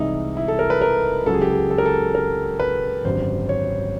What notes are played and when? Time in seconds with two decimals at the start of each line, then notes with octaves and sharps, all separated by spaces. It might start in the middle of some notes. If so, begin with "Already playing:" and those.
Already playing: C2 C3 E3 G#3 D#4 E4
0.37 E4
0.48 A4
0.59 A#4
0.70 B4
0.81 A#4
1.26 C#2 C#3 F#3 A4
1.34 G#4
1.42 G4
1.50 G#4
1.70 A4
1.78 A#4
1.86 A4
2.15 A#4
2.60 B4
3.04 G#1 F#2 D3 G3 C5
3.49 C#5